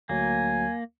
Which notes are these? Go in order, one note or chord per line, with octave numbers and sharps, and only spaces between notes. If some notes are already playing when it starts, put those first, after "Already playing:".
D2 F#3 A#3 G#5